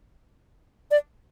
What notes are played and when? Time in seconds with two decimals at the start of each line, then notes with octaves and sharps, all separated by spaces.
0.91 D5